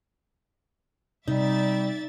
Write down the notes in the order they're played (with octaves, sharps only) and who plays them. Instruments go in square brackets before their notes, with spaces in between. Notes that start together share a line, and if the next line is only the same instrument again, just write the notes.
[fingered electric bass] C3 [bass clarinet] G3 [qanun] D#4 [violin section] D5 E5 A6